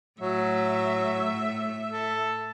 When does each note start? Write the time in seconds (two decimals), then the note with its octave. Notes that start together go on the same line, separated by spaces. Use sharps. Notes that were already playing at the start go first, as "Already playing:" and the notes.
0.20 A2 F#3 E5
1.92 A4